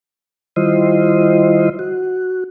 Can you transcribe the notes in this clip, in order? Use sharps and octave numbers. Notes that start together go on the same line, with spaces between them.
D#3 G3 E4 F4 C5 D#5
F#4